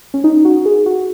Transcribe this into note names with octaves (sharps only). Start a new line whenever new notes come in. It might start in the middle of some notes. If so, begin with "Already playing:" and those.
C#4
D#4
F#4
G#4
F#4